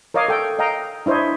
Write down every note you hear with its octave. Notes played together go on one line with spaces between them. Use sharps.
A#4 C#5 D#5 F5 D6
A4 G5
D#5 F5 G5 A#5
D4 E4 C5 C#5 D#5